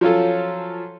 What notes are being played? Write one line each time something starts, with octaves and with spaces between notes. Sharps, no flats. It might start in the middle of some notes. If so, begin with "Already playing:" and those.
F3 F#3 C#4 F4 A4